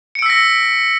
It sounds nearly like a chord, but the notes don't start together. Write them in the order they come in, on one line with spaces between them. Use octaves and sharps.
C#7 D7 E6 B6 A#6